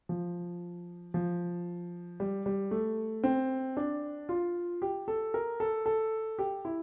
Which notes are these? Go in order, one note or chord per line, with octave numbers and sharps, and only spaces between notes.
F3
F3
G3
G3
A3
C4
D4
F4
G4
A4
A#4
A4
A4
G4
E4